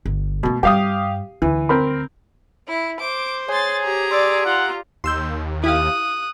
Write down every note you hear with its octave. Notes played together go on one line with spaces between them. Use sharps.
G1
B2 A3 A#3
G2 G3 G4 F5 D#6
D2 E3
C4 A#4 B5
E4
C5 D6
G#4 C#5 G#5 C6 A6
G4 A#5
D5 C6 E6 D7
F4 F#5
D#2 C6 E6 G6
E4 G4 F5 D#6 F#6